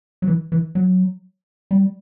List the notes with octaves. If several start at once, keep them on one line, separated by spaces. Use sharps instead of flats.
F#3
E3
E3
F#3
G3